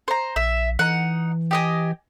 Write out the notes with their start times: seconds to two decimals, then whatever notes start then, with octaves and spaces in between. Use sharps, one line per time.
0.08 C5 A#5
0.36 A#1 E5
0.79 E3 D#4 F#5
1.51 G4 D#5 G#5